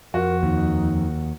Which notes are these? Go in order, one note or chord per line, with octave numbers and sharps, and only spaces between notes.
F2 F#4 A#4
D#2 D#4